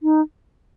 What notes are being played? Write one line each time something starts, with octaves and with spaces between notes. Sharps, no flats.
D#4